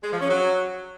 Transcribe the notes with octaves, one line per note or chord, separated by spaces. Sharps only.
G#3
F3
C#4
F#3